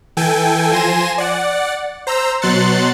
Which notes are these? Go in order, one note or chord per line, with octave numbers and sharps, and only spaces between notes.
E3 A4 G5 G#5
F3 G#5 C6 A#6 D#7 E7
D5 F#5
C5 A#5 E6
B2 F#3 C6 F#6 A6 C#7